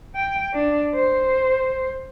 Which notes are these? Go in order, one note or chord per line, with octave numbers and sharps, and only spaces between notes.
G5
D4
C5